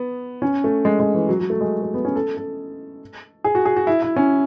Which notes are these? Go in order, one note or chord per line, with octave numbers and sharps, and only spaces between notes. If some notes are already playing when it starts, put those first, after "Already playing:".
Already playing: B3
C#4
A3
G#3
G#3
E3
F#3
F#3
A3
G#3
A3
B3
C#4
A4
A4
G#4
F#4
G#4
F#4
E4
E4
C#4